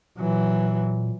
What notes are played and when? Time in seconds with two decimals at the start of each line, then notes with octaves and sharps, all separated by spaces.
0.18 A#2 E3 F#3